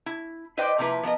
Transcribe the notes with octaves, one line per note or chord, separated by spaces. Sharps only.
E4
E4 B4 C5 D5 D#5 G5
C3 F3 A#3 E4 B4
F3 B3 A#4 D#5